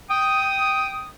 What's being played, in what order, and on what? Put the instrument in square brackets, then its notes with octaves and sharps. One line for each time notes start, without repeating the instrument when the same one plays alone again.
[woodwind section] G5 D#6